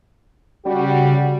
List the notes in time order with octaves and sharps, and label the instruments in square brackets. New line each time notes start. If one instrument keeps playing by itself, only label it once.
[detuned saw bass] C#3 [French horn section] G3 F#4